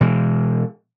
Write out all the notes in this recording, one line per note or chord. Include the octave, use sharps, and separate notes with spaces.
B2 E3 G#3